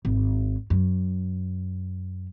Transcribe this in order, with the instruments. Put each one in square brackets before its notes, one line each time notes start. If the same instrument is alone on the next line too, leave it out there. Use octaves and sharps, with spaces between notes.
[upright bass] G#1
F#2